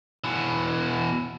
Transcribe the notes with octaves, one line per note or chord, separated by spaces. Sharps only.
B2 E3